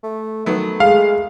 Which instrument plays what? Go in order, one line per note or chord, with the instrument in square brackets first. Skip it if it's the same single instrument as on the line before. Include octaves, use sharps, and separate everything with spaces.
[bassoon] A3
[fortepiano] D#3 F#3 B3 [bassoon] A3
[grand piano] G#3 [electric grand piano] F5